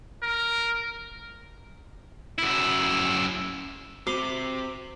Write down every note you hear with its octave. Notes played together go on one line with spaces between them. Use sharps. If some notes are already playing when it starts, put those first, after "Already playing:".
A#4
F#2 E4
C3 F#4 C5 D6 C7 G7